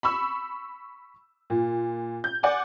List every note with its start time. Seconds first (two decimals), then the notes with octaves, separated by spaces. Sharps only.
0.03 B5 C#6 E6
1.50 A#2
2.24 G6
2.43 D5 F#5 G#5 D6